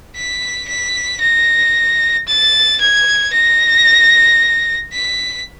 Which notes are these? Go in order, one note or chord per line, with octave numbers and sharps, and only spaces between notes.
B6
B6
A#6
A6
G#6
A#6
B6